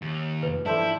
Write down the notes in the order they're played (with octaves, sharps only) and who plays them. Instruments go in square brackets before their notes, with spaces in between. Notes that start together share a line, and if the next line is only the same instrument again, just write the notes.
[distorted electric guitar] D#2
[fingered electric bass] F2 C3 [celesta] B4
[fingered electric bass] G#2 E3 F3 [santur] D4 A4 C5 [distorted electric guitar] E4